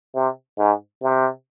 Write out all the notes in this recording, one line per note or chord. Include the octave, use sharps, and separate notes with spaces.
C3
G#2
C3